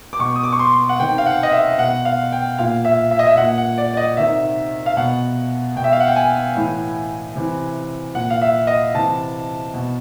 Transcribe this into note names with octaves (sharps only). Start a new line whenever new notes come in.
D6
B2 C#6
D#6
D6
C#6
C6
F#5
C3 D#3 G5
F5
F#5
D#5
E5
B2 F#5
F5
G5
A#2 F5
E5
E5
D#5
E5
A#2 F#5
F#5
D5
D5
D#5
C3 D#3 E5
F5
B2 F#5
B2 G5
E5
F5
F#5
G5
G#5
A2 E3
C3 E3
A#2 F#5
F5
E5
D#5
C3 E3 A5
B2